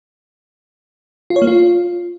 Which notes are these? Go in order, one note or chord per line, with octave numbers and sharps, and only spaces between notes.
F4
C#5
A#3
F4